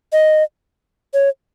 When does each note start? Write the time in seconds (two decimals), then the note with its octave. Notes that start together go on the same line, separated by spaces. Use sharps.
0.13 D#5
1.14 C#5